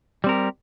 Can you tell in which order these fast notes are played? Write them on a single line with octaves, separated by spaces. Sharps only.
G3 C4 A#4 G4